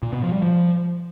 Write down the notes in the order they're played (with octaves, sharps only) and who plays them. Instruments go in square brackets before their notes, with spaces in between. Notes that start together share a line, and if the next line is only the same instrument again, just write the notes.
[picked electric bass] A#2
B2
F3
G3
F3